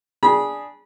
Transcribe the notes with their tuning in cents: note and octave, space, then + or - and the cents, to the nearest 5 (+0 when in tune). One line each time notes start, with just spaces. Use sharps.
D4 +0 G#4 -5 B5 -30